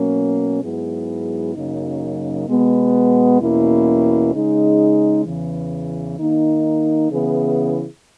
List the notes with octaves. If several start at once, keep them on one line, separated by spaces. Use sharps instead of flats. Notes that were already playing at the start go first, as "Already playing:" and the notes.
Already playing: B2 F#3 A#3 C#4
G#2 F#3 B3 E4 G#4
F#2 C#3 F#3 A#3 D#4
B2 G#3 B3
E2 B2 A#3 C#4 E4
C#3 G#3 D#4 G#4
E2 C#3 E3
D#3 A#3 D#4
C#3 E3 B3 E4 G#4